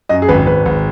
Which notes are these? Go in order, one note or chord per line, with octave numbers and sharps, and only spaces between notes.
F#2 D#5
G#4
G#1 B4
G#1 B4
G#1